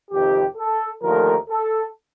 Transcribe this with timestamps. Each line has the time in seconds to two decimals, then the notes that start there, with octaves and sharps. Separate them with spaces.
0.11 F2 C3 D#3 G4
0.56 A4
1.03 D#2 D3 F3 A3 A#4
1.50 A4